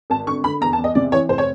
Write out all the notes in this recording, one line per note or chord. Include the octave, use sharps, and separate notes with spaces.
G#1 A5
D3 C#6
D3 B5
E2 A#5
A5
E2
D#5
C3 D5
E3 C#5
F1 C5
C#5